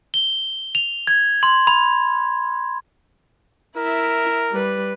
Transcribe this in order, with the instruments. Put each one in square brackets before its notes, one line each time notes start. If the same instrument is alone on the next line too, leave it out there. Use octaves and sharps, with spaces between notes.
[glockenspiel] G7
F7
G#6
C6
B5
[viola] E4 E5 [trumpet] A#4
[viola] G3 B4